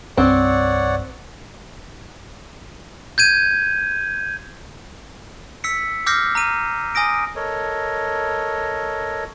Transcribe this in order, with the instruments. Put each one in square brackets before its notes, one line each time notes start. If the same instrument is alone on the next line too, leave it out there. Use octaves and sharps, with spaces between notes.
[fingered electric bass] C2 G2 [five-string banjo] C4 [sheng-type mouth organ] C#5 D5 F#5
[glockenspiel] G6 G#6 D#7
E6 B6 C#7
D6 E6 F6 G6 A#6 C7
A#5 F6 D#7
G#5 D#6 A#6 D7
[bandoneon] A4 A#4 C#5 D#5